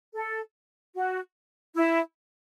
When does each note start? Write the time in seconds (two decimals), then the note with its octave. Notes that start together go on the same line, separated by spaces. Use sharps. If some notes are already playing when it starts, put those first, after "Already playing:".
0.15 A4
0.95 F#4
1.75 E4